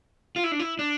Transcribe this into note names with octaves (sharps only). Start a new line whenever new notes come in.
F4
E4
D4
E4
D4